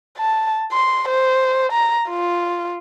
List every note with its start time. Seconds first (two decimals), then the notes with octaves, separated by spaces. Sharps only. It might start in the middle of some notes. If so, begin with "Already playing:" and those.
0.18 A5
0.72 C6
1.09 C5
1.72 A#5
2.09 F4